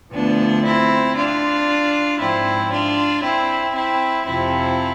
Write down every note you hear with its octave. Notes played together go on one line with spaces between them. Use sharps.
D2 D3 F3 B3 D4
C4 E4
D4 F4
G#2 F3 C4 E4
D4 F4
C4 E4
C4 E4
F2 C3 F3 C4 E4